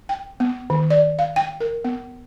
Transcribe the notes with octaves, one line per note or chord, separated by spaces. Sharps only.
G5
B3
D#3
D5
F5
G5
A#4
B3